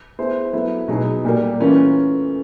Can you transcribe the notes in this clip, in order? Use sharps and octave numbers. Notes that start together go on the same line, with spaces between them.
B3 E4 G#4 C5
F#3 B3 E4 A4
B2 F#3 B3 D#4 G#4
A#2 G3 A#3
E3 A3 C#4 F4 A#4